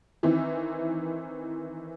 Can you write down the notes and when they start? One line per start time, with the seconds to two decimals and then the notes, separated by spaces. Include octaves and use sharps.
0.23 D#3 E3 C4 E4